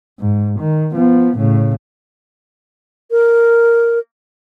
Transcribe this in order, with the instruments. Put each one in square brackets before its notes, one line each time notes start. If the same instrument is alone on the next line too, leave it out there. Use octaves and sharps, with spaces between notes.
[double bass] G#2
D#3
F3 B3
A2 C#3
[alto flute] A#4